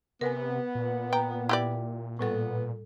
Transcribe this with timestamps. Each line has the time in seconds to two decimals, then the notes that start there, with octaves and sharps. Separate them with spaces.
0.21 C3 B3 A#4 B4 G#5
0.75 A#2
1.13 G5 A#5
1.49 E4 G4 D5
2.19 A2 G3 B3 A4